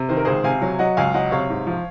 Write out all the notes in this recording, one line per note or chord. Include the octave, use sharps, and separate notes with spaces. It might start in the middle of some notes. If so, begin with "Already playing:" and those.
Already playing: C3
D#3 C5
A#4
C#2 G#4 C5
C3 F5 G#5
F#3
F#3 D#5 F#5
C#2 F5 G#5
F#3 D#5 F#5
C3 C#5 F5
G#2
F3